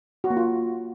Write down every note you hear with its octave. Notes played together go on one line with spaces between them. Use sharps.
F#4
A#3
F4